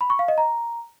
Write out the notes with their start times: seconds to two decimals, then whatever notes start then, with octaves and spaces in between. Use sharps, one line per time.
0.01 B5
0.10 C#6
0.19 F5
0.28 D#5
0.38 A#5